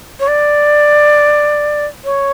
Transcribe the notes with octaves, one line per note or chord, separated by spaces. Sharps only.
C#5
D5
C#5